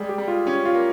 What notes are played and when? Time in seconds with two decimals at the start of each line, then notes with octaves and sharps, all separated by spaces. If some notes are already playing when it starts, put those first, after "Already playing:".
Already playing: G3 G#3 G#4
0.09 G4
0.18 G3
0.28 F4
0.46 C#4 G4
0.65 F4
0.75 A#3